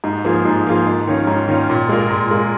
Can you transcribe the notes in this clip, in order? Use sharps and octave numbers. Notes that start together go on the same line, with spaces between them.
G#2
F3 A#3 F4 G#4
G#2
F3 A#3 F4 G#4
G#2
D#3 C#4 F4
G#2
D#3 C#4 F4
A#2
G#3 F4 A#4
A#2
G#3 F4 A#4